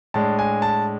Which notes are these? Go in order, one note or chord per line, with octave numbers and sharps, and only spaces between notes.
A2 G#3 D4 A5
G#5
A5